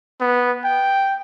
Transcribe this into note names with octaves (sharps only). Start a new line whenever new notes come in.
B3
G5